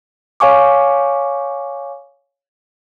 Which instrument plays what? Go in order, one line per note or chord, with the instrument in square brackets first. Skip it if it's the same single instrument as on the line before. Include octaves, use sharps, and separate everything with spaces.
[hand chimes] C#5 F5 G#5 C#6 D6